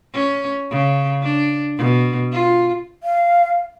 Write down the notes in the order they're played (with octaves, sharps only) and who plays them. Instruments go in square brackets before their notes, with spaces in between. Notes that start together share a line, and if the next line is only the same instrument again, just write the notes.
[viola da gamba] C#4
C#3
D4
B2
F4
[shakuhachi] F5